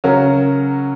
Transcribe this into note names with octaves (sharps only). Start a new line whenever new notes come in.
C#3 F#3 C#4 F#4 A#4